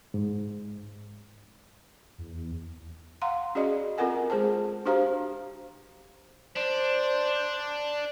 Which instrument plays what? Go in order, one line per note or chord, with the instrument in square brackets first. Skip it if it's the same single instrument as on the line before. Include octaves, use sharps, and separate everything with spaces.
[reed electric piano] G#2
[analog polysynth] E2
[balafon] F5 F#5 A#5 C6
C#4 F#4 G#4 D5 D#5
C4 F4 A4 A#4 F#5 G#5
G#3 G#4 C5 A5
D4 F#4 G4 C5 F5 A#5
[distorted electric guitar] D4 [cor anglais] C5 [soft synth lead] D5